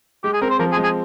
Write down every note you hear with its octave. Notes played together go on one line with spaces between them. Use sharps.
G#3 G4
G#4
C4 A#4
C5
F3 A#4
G#4
G#3
G#4